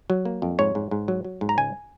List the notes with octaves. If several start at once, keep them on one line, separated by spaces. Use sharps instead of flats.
F#3
A#3
F2
G#2 C#5
G#2
G#2
F#3
F#3
G#2
A#5
C#2 G#5